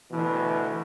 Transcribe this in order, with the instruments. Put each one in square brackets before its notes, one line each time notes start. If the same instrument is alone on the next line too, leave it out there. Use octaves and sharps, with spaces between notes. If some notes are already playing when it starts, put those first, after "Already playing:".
[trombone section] D2 B2 [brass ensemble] E3